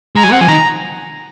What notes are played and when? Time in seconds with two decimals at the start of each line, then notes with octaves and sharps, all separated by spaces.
0.15 G#3 A#5
0.24 F#3 G#5
0.32 C4 F#5
0.40 F3 G#5
0.48 D#3 A#5